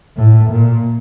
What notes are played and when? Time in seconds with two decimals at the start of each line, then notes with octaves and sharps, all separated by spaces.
0.17 A2
0.51 A#2